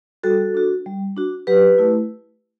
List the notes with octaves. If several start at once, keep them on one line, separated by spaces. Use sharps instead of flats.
G3 F#4 A4
D4 F#4
G3
D4 F#4
F#3 G4 B4
A3 E4